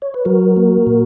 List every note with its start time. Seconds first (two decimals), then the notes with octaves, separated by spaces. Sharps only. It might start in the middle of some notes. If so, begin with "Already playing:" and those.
0.02 C#5
0.14 B4
0.25 F#3 F#4 A#4
0.57 A#3
0.87 A#2